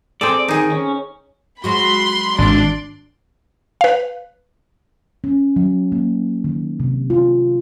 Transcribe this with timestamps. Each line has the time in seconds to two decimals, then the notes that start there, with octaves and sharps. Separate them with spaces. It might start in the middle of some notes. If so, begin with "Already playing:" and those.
0.21 C4 G#4 A4 D5
0.48 D#3 D#4 G#4
0.72 C#4
1.64 F#3 G#3 F#4 B5 C6
2.38 G#1 D4 D5 C6
3.81 B4 F5
5.24 C#4
5.56 F#3
5.92 A#3
6.44 D#3
6.80 C3
7.10 F4